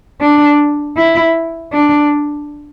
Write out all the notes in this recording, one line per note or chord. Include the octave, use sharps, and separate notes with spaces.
D4
E4
D4